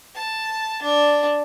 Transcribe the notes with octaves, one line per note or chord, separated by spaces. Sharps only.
A5
D4